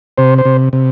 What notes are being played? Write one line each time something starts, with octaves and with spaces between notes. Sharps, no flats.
C3 C5
C5
C3
C3